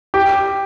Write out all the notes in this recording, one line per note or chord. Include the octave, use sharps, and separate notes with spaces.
G4